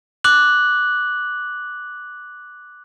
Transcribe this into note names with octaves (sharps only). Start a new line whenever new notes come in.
D6 F#6 F#7